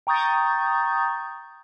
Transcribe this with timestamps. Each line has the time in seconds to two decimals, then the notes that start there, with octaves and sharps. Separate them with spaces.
0.07 G5 A#5 C#6 D#6 G6 A6